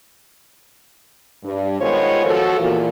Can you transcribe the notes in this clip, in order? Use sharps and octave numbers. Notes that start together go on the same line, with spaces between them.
G2
D#3 G#3 B3 F4 C5 C#5
F3 F#4 A4
E2 A#2